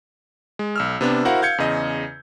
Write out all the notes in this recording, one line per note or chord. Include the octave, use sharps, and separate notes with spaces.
G#3
B1 E6 F6
C3 B3 D4
E4 F#4 A#4 C5 F5 F#5
F5 G6 G#6 C#7
E2 C#3 D#5